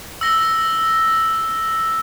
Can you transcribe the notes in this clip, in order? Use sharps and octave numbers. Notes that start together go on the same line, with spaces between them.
E6 A#6 G7